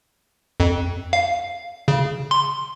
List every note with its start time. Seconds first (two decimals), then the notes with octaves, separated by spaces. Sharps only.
0.60 F2
1.13 F5
1.88 C#3
2.31 C6